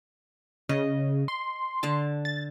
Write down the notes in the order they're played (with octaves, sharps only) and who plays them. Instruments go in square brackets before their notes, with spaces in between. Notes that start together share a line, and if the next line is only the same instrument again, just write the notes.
[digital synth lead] C#3 [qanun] D#5
[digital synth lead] C6
[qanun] D3 A5
[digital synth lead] A6